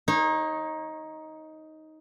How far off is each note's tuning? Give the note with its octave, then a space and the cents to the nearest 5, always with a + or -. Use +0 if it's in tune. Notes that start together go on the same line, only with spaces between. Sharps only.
D#4 +10 C#5 -35